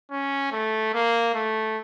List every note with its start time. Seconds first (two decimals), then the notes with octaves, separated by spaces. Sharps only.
0.11 C#4
0.52 A3
0.94 A#3
1.34 A3